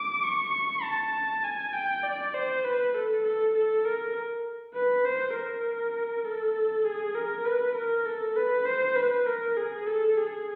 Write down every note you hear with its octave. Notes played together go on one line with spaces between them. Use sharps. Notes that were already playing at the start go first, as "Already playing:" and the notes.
Already playing: D6
C#6
A5
G#5
G5
D5
C5
B4
A4
A4
A4
A#4
B4
C5
A#4
A4
G#4
A#4
B4
A#4
A4
B4
C5
B4
A#4
G#4
A4
G#4